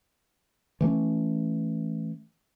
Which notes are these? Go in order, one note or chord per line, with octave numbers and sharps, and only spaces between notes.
E3 A3 C#4